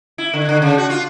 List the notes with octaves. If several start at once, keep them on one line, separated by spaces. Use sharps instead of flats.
E4
D3
D3
C#3
F#4
F4